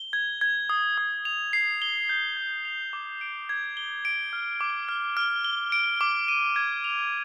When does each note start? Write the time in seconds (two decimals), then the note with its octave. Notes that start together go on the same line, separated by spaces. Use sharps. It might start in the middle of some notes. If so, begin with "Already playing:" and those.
Already playing: G7
0.13 G#6
0.41 G#6
0.69 D#6
0.98 D#6
1.25 F7
1.53 C7
1.82 G7
2.09 G6
2.37 G#6
2.65 F7
2.93 D6
3.21 D7
3.49 G#6
3.77 G7
4.05 D7
4.33 F6
4.61 D6
4.88 F6
5.17 F6
5.44 G7
5.72 D7
6.01 D6
6.28 D#7
6.56 G#6
6.84 F7